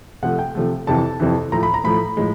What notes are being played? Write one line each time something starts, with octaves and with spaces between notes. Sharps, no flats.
C3 F3 A3 F#5
G5
C3 F3 A3
F2 C3 E3 A5
F2 C3 E3
A2 F3 A3 A#5
B5
A#5
A2 F3 A3 B5
A2 F3 G#3